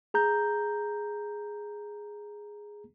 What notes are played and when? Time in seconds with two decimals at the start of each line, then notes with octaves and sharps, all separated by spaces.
0.14 G#4 A#5 G6